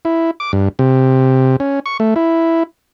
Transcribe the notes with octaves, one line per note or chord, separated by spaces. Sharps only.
E4
D6
G2
C3
C#4
C#6
A3
E4